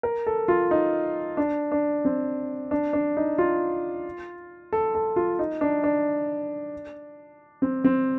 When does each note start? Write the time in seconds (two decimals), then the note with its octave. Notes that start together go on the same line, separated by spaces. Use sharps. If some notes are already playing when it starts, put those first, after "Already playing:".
0.03 A#4
0.27 A4
0.48 F4
0.71 D#4
1.37 D4
1.72 D4
2.05 C4
2.71 D4
2.93 D4
3.17 D#4
3.38 F4
4.73 A4
4.95 A4
5.16 F4
5.39 D#4
5.61 D4
5.84 D4
7.62 C4
7.84 C4